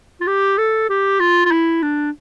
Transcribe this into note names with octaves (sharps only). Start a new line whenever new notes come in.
F4
G4
A4
G4
F4
F4
E4
D4